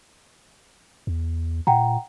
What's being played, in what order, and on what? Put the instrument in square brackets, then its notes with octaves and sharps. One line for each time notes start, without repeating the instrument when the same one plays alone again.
[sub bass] E2
[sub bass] A#2 [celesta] F#5 G5 A#5